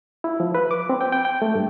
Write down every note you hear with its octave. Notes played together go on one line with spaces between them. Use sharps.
E4
F3
B4
D6
C4
G5
G5
G5
A3
G2